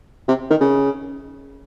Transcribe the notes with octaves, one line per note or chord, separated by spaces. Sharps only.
C3
D#3
C#3